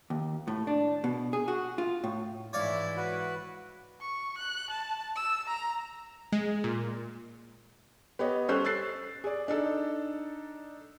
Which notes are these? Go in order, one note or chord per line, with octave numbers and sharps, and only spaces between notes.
D#2
A2
D4
B2
G#4
F#4
F4
A2
G#2 E3 E4 C#5 D5 F5
F#4 B4
C#6
F#6
A5
E6
A#5
G#3
A#2
B3 G4 C#5 D#5
G3 C#4 A4 C5 F#6
E6 F#6 A6 C7
G#4 D5
D4 D#4 A4